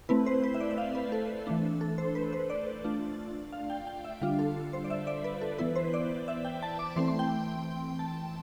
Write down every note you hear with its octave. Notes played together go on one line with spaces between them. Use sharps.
A3 C4 E4 B4
C5
B4
E5
D5
E5
F5
B4
A4
E3 A3 D4
A4
C5
B4
C5
D5
A3 D4 F4
F5
G5
G5
E5
D3 G3 D4 F4 F5
A4
C5
D5
E5
D5
B4
A4
E3 B3 E4 B4
C5
D5
E5
G5
A5
D6
E3 A3 C4 C6
C6
G5
A5